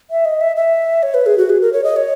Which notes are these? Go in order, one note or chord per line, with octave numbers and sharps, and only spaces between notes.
E5
D#5
E5
E5
C#5
B4
G#4
F#4
G#4
A#4
C#5
D#5
C#5